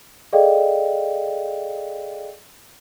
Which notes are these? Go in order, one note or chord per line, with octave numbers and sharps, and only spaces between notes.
G#4 A4 D5 D#5 F5 G5